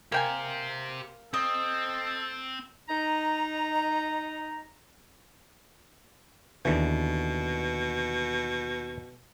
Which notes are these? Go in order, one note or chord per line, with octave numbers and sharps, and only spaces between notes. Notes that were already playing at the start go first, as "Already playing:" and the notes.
A#3 G4 A#4 C5 G5 G#5
C4 A4 D#5
D#4 A#5
D#2 B2 D3 E3